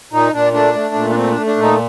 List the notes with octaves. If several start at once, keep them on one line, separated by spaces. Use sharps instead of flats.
A#2 D#4
A#2 D4
A3 D4
A3
A#2
D4
A3 C4
D4
A3
D4
A#2
D#4